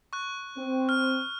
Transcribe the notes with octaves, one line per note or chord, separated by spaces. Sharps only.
C#6 F#6
C4
F6